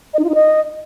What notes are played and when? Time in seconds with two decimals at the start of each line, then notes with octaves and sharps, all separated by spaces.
0.14 D#5
0.19 D#4
0.24 F4
0.29 D#4
0.35 D#5